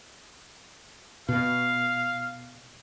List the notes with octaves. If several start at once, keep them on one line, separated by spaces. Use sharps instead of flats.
B2 F5